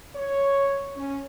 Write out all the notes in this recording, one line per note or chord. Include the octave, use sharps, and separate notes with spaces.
C#5
C#4